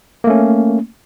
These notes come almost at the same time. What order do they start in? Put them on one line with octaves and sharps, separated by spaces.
A#3 A3 C#4